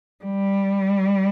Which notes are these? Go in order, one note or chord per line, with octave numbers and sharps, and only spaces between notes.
G3